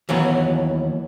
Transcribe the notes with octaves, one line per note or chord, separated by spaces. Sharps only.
D#2 E3 F#3 B3